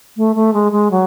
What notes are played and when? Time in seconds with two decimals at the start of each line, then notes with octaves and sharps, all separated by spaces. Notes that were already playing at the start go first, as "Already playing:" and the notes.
0.17 A3
0.36 A3
0.53 G#3
0.72 G#3
0.91 F#3